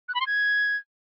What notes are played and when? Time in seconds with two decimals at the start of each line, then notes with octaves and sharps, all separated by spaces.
0.08 F#6
0.14 B5
0.20 C6
0.27 G#6